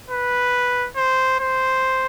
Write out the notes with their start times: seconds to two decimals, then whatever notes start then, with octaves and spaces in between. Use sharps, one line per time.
0.10 B4
0.97 C5
1.40 C5